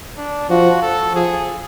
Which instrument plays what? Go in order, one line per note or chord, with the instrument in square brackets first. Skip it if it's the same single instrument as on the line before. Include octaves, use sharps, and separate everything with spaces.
[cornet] D4
[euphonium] F3 [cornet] F#4
[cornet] A4
[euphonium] F3 [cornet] G#4